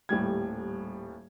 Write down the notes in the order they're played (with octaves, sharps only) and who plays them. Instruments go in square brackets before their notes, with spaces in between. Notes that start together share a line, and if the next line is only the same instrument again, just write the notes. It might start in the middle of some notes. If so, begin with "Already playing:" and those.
[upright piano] D#1 A2 G3 G#6